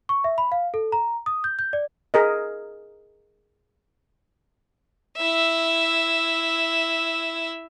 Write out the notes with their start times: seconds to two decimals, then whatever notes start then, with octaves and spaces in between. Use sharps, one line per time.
0.09 C#6
0.24 E5
0.38 B5
0.52 F5
0.74 A4
0.92 A#5
1.26 D#6
1.44 G6
1.59 G6
1.73 D5
2.14 G#4 A#4 D#5
5.17 E4 E5